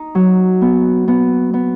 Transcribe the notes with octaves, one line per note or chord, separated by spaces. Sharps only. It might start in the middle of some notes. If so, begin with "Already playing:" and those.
Already playing: D#4
F#3
B3
B3
B3